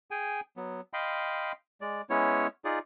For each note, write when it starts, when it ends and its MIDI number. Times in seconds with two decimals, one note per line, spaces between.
0.11 0.40 68
0.11 0.40 79
0.11 0.40 80
0.57 0.81 54
0.57 0.81 59
0.93 1.52 75
0.93 1.52 77
0.93 1.52 79
0.93 1.52 83
0.93 1.52 84
1.81 2.02 56
1.81 2.02 74
2.10 2.47 56
2.10 2.47 59
2.10 2.47 61
2.10 2.47 64
2.10 2.47 73
2.65 2.79 63
2.65 2.79 65
2.65 2.79 68
2.65 2.79 74